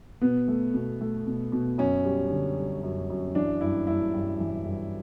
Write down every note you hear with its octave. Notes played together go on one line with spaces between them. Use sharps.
B2 B3
A3
B2
A3
B2
B2
F#2 C#4
G3
D3
G3
F#2
F#2
E3 D4
G2 E4
G2 E4
G2
E3
G2